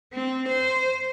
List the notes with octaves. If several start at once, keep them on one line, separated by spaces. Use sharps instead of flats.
C4
C5